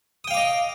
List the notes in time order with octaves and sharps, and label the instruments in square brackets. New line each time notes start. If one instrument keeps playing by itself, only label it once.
[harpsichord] D#6
G5
F5
D6
D#5